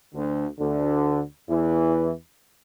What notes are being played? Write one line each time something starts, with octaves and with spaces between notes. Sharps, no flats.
D2 D3
D2 D3
E2 E3